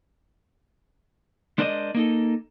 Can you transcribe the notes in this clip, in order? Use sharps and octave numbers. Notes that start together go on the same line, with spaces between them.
G#3 D4 A#4 C5 D5 D#5
A#3 D#4 A4